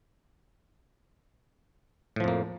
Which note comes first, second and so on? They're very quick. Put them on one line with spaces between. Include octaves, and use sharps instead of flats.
A2 F3 F2 A#3